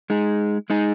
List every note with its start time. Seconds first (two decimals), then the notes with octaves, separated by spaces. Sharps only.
0.10 G#3 D#4 G#4
0.70 G#3 D#4 G#4